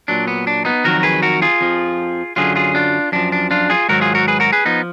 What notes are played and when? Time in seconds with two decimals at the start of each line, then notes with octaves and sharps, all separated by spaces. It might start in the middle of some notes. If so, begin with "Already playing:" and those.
0.08 A#2 F#3 D4
0.28 B3
0.47 D4
0.65 B3 D#4
0.84 F2 D#3 F#3 F#4 A#4
1.03 G#4 B4
1.22 F#4 A#4
1.42 F4 G#4
1.61 F2 F3
2.36 F#2 D3 F#3 F4 G#4
2.56 F4 G#4
2.75 D4 F4
3.12 F#2 F3 D4
3.32 D4
3.51 D4 F4
3.70 F4 G#4
3.89 G#2 D#3 F#3 F#4 A#4
4.01 F4 G#4
4.15 F#4 A#4
4.28 G#4 B4
4.40 F#4 A#4
4.53 G#4 B4
4.66 F3 B3 D#4